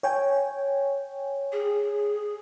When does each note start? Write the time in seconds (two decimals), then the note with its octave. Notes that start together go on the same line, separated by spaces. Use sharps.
0.03 C#5 G5 G#5
1.52 G#4